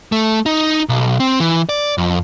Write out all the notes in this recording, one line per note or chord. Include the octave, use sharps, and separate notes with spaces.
A3
D#4
B1
C4
E3
D5
F2